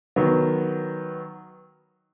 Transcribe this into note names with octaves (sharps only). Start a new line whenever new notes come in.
D#3 F#3 B3